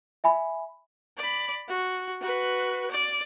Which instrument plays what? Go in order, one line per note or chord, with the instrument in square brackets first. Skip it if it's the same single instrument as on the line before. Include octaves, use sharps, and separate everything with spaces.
[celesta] E5 G#5 B5
[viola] D5 B5
F#4
F#4 B4
D5